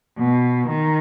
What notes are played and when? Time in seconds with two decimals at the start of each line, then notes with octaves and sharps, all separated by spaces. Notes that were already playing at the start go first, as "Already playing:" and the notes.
0.18 B2
0.69 D#3